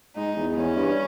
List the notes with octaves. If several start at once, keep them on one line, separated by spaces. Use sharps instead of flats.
G#2 D#4
E2
E2 C#4
G2